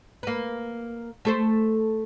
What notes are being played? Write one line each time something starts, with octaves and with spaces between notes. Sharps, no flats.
A#3 B4
A3 A4 C5